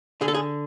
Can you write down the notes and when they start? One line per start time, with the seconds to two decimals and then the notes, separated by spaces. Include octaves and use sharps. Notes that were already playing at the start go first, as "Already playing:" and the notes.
0.21 D3 G#4
0.28 A4
0.34 G#4